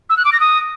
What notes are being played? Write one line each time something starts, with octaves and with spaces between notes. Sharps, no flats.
E6
F#6
D6
A#6
D#6